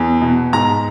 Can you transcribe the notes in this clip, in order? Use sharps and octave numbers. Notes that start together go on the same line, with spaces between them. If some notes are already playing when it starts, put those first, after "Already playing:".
Already playing: E2
B2
G#2 A#5